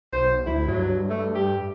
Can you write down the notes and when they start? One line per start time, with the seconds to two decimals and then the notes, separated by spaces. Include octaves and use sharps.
0.13 B1 C5
0.46 D2 E4
0.68 G2 F#3
1.10 A3
1.35 G4